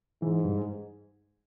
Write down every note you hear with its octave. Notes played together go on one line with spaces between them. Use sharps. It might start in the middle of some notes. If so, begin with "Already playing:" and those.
G#2 E3
G2